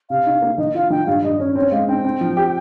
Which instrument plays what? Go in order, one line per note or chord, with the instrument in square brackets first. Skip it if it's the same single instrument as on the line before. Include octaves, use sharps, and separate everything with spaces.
[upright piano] C3 [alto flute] F5
[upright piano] D#4
A#3
[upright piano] D#3 [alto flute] D#5
[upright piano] F4 [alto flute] F5
[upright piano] D#3 [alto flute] G5
[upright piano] G2 [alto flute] F5
[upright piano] G2 [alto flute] D#5
[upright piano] C#4 [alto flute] C#5
[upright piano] C4 [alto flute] C#5
[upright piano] G#3 [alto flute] F5
[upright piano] C4 [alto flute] G5
[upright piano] C4
F3
G4